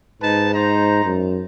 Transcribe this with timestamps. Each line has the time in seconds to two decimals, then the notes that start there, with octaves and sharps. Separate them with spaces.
0.22 G#2 D#4 B4 A5
0.54 D#4 C5 A#5
1.05 F#2